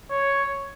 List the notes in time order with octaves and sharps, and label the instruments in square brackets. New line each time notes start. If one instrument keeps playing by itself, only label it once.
[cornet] C#5